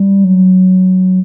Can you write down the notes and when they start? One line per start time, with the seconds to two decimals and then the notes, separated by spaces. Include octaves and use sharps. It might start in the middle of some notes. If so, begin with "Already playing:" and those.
Already playing: G3
0.24 F#3